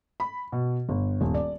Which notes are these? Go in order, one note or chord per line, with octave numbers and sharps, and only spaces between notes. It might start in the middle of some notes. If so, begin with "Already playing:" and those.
B5
B2
G1
D#1
D5